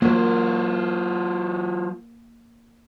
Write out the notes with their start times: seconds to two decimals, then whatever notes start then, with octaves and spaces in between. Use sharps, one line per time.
0.02 F#3 A#3 F4 F#4